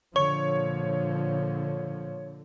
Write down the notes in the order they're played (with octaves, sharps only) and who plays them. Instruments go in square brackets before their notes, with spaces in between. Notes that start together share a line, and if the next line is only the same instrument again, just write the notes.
[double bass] A#2 F3 [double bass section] D3 [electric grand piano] C#5 [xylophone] C#6